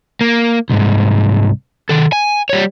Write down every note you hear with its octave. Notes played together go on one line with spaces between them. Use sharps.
A#3
C2 G#2
D#3 A4
G#5
G3 C#5